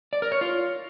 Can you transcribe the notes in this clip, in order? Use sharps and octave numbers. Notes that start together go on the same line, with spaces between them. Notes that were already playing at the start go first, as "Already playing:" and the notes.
D5
A#4
C#5
F4